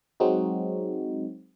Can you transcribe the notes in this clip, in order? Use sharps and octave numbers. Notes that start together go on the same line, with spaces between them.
F#3 G#3 C4 D#4 F#4